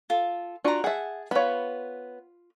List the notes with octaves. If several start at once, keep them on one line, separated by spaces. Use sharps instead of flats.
F4 A4
D4 F4 F#4 A#5 C#6
G#4 E5 F#5 A5
B3 F4 C#5 B5